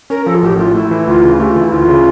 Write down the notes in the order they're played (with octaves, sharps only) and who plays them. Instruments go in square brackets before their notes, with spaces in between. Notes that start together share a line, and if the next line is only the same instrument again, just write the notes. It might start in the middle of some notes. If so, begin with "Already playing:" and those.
[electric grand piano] C#4 [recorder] A#4
[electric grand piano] F3 [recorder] A4
[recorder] F4
[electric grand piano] A1 [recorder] G4
[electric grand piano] A2 [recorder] F4
[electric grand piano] A3 [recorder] E4
[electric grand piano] E3
[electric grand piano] D2 [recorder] F4
[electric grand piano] C#3
[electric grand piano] A3 [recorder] G4
[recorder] F4
[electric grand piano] E3
[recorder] E4
[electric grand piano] D2 [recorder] F4
[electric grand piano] C#3